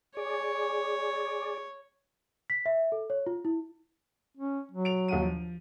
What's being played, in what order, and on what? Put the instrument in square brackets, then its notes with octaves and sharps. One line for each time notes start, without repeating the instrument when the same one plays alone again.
[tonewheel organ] G#4 D5 [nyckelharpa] C#5
[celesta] B6
E5
A4
C#5
F4
E4
[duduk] C#4
F#3
[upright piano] D7 F7
D#2 F#5 D#7
F3